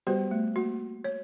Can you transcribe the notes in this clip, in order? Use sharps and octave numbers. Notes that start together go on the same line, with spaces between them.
G3 B3 F#4 G4 B4 C5
A3
A#3 F#4
C#5